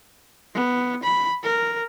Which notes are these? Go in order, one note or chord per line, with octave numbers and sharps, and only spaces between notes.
B3
B5
A#4